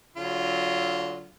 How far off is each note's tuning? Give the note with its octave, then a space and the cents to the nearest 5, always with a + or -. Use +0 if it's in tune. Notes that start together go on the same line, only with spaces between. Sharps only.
D3 -30 F#3 +0 F4 -10